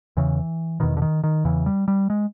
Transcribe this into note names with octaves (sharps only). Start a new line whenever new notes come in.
E2 C#3 E3
E2 B2 D#3
D3
D#3
D#3
E2 C#3 E3
G3
G3
G#3